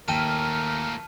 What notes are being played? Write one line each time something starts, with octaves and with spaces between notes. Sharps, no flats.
D#2 A#2 A3 A#4 G5 A5 F6 D#7